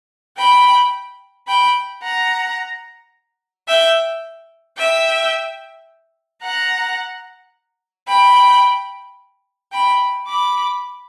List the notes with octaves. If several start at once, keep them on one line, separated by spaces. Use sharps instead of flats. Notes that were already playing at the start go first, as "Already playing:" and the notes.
G5 B5
G5 B5
F#5 A#5
E5 G5
E5 G5
F#5 A#5
G5 B5
G5 B5
B5 D6